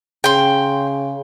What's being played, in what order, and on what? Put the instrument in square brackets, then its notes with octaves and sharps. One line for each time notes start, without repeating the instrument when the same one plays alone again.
[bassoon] C#3 [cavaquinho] G5 C6